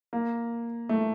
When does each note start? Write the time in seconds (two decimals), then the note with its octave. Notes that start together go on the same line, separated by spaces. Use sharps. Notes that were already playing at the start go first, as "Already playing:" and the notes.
0.13 A#3
0.89 A3